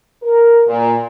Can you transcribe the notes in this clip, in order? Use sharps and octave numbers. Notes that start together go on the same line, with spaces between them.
A#4
A#2